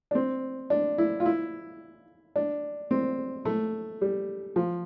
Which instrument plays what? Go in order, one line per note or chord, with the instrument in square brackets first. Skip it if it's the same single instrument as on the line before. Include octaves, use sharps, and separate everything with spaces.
[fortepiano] D4
C4
D4
E4
F4
E4
D4
C4
A3
G3
F3